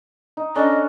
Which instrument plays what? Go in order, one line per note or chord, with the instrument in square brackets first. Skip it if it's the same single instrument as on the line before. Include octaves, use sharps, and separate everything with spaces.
[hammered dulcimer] D#4
[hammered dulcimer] C#4 D4 A4 [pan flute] D#5